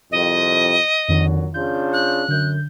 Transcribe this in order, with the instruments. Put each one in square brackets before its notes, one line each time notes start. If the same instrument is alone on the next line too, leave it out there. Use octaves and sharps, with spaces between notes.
[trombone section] C2 F2 [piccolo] D#5
[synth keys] F2 D#3 [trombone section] A#2 D3 F#3
[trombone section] C#3 D4 F4 [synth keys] G6
[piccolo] F#6
[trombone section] F#2 [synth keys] D3 G6